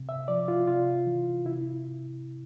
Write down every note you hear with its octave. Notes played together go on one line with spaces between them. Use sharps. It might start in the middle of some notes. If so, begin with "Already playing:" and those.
Already playing: C3
E5
F3 D5
F4
C3 F4
E3
C3 E4